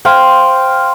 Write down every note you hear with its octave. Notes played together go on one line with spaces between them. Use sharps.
C5 F5 G5